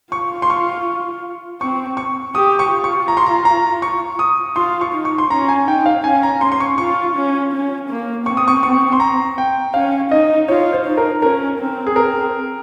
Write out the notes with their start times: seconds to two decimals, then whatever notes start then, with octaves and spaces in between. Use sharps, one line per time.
0.12 F4 C#6
0.42 C6
0.50 C#6
1.61 C4 C#6
1.97 C#6
2.35 G4 D#6
2.59 C#6
2.71 F4
2.84 C#6
3.08 A#5
3.17 C6
3.26 A#5
3.45 A#5
3.82 C#6
4.19 D#6
4.56 F4 C6
4.81 C#6
4.93 D#4
5.05 C#6
5.18 C6
5.30 C#4 A#5
5.49 G#5
5.67 D#4 G5
5.86 F5
6.04 C#4 G#5
6.23 A#5
6.41 C#4 C6
6.52 C6
6.60 C#6
6.78 F4 C#6
7.16 C#4
7.52 C#4
7.89 A#3
8.26 C4 C#6
8.37 D#6
8.48 C#6
8.63 C#6
8.92 C6
9.00 A#5
9.38 G5
9.74 C#4 F5
10.11 D#4 D#5
10.48 F4 C#5
10.73 C5
10.86 D#4
10.97 A#4
11.22 C#4 A#4
11.59 C4
11.87 G#4
11.96 C4 A#4